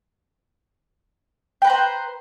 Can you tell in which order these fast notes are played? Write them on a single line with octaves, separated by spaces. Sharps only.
G5 B4 A#5 C5